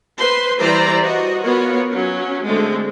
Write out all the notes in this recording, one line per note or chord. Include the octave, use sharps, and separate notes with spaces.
B4 C5 C6
E3 G3 B4 C5 D5 A#5
F#4 D#5
B3 F4 F#4 A#4 C#5
F#3 C#4
D3 G#3 A3 C4